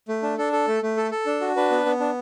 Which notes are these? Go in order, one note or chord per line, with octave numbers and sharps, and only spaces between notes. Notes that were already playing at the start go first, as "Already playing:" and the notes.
A3
D4
D4 A4
A4
A3
A3
A4
A4
D4
F#4
D4 B4
B3
B3
D4